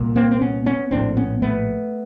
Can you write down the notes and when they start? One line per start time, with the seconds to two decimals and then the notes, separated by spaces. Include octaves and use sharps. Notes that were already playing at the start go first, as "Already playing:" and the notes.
Already playing: C2 A#2
0.16 A#3 C4
0.31 C4
0.41 B3 C#4
0.66 B3 C#4
0.91 A#1 A2 C4 D4
1.17 B3 C#4
1.42 A3 B3